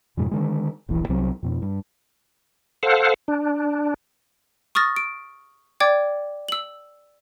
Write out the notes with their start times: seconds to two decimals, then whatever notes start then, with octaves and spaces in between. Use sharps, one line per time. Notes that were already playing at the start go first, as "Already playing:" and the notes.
0.17 F2 G#2 B2 G#3
0.31 D3 D#3 G#3
0.89 D#1 A#1 E3
1.09 C2 C3 F#3 C4
1.43 F2 B2
1.62 G2
2.83 A4 C5 F5 F#5
3.28 D4
4.75 C#6 D#6 F6 A6 A#6
4.96 D7
5.80 D5 G5 D6 G#6 A6
6.48 E6 F#7